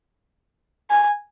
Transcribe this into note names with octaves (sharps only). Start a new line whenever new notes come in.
G#5